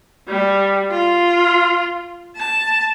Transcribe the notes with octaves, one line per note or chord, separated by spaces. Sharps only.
G3
F4
A5